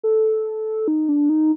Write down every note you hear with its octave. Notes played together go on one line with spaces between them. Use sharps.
A4
D#4
D4
D#4